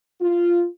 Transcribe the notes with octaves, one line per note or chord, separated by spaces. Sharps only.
F4